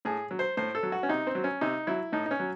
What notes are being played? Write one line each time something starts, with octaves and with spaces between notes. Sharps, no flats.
A2 G#4
F#3
C5
A2 C5
A4
F#3
F#4
C#4
C3 D#4
C4
F#3
C#4
C3 D#4
F#3 E4
A2 D#4
D#4
C#4
F#3